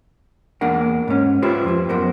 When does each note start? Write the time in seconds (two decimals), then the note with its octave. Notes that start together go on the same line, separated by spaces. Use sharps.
0.61 E2 A#3 D4 A#4 F#5
1.08 G#2 C#4
1.42 E4 F4 G4 B4 C5
1.64 F2 F3
1.89 F#2 B3 A#4 C5